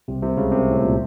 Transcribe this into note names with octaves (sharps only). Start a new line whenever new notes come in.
C2 C3
C2 C3
C#2 C#3
C2 C3
A2
A#2